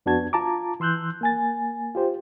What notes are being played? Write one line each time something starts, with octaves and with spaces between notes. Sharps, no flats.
F2 B3 D4 F#4 A5 G#6
F4 A5 A#5 D6
E3 C6 E6 F#6 G6
A#3 G#5 A6
F4 G4 C5